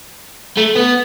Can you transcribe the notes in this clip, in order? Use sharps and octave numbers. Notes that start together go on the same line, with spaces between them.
A3
B3